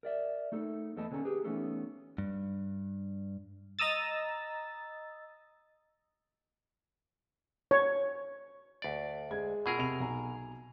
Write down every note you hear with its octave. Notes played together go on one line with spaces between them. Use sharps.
A#4 D5 E5
A3 D#4 A4
E2 A3 A4 B4 D#5 A5
D3 B3 C#4 A4 A#5
G4 G#4 B4
E3 A3 B3 C#4 D#4 A4
G2
D#5 A#5 D#6 E6 A6
C#5
D2 D5
G#3 G#6
B2 F4 G#4 A#4 E6
C3 F7
B1 G#5 A#5